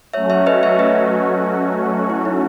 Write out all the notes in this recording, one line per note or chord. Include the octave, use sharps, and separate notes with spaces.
F#3 A3 C#4 F#4 C#5 E5
C#5 E5
B4 D#5
C#5 E5
B4 D#5
E4
D#4